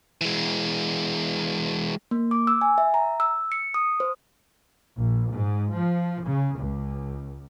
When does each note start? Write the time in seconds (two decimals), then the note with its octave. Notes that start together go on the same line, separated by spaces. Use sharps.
0.21 E3 G#3
2.11 A#3
2.31 D6
2.47 E6
2.61 G#5
2.78 E5
2.94 A#5
3.20 E6
3.52 C#7
3.74 D#6
4.00 C5
4.96 A#1
5.32 G#2
5.71 F3
6.24 C#3
6.56 C#2